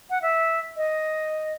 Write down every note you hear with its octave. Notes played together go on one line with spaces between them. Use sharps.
F#5
E5
D#5